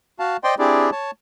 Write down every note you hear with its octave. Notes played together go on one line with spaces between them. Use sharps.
F#4 F5 A5
C5 D5 D#5 G5 C6
C4 D4 E4 G4 G#4 D5
C#5 A5